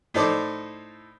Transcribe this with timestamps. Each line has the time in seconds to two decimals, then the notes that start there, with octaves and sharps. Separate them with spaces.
0.14 A2 D#4 A4 C5 D5 D6